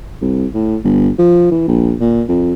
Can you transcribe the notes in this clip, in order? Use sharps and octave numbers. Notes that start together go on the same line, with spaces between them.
C2
A2
G1
F3
E3
A#1
A#2
F2